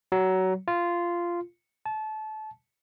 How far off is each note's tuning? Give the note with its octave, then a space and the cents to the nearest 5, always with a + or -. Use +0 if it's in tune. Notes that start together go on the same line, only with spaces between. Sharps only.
F#3 +20
F4 -10
A5 -25